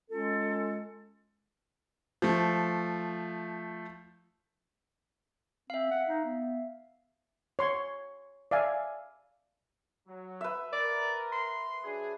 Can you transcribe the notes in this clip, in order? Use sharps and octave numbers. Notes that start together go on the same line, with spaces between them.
G#3 C#4 F4 A4
F3 A3
C4 E5 F5
F#5
D#4
B3
C#5 C6 C#6
D5 E5 F5 G#5
F#3
B4 E5
A#4 D5
C6
F#3 D4 G#4